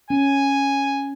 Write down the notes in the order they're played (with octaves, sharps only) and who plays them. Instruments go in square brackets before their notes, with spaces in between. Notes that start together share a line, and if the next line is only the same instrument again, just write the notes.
[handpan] C#4 [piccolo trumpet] G#5